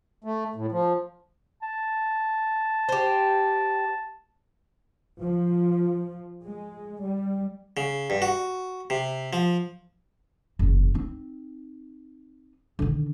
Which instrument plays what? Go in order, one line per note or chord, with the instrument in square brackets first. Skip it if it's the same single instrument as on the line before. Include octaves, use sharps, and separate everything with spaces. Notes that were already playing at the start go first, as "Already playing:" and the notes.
[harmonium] A3
A2
F3
[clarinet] A5
[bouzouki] G4 C5
[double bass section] F3
G#3
G3
[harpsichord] C#3
G2
F#4
C3
F3
[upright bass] F#1 E2
C4 D#4
D3 D#3